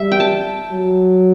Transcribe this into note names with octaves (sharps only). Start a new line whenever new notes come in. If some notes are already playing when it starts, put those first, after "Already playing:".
Already playing: G3 E5
G5
A5
F#3